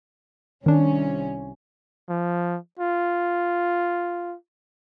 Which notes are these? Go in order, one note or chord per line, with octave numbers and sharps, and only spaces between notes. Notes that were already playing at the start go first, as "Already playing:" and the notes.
C2 D#3 C#4 D4
F3
F4